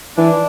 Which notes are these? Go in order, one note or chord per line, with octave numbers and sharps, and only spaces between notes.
E3 D4